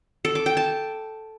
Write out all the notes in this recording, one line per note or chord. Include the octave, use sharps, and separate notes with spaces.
A4
D6
G5
A5